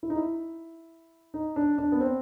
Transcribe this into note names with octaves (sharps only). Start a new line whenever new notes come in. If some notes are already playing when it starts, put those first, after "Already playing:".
E4
D#4
E4
D#4
D4
D4
B3
C4